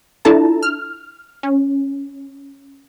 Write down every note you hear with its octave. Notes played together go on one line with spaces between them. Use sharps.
D4 E4 F4 A4 A5 A#5
F6
C#4